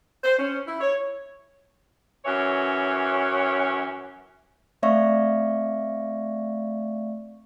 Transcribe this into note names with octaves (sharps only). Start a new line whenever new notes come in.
C5
C#4
E4
C#5
F#2 E3 C#5
A3 C4 D5 E5 F5 C#6